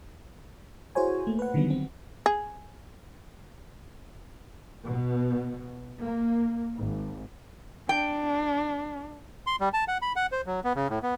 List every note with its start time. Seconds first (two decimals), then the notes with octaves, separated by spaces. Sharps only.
0.95 E4 F#4 G#4 C5 C#5 G#5
1.27 A3 A#3
1.39 B4 F#5
1.54 D3 D#3 F#3 G3 B3
1.70 C4
2.26 G#4
4.88 B2
6.04 A#3
6.78 G#1
7.89 D4 G5
9.47 C6
9.60 G3
9.74 A5
9.88 F#5
10.02 B5
10.16 F#5
10.32 C5
10.46 F#3
10.64 B3
10.75 C#3
10.90 A2
11.03 B3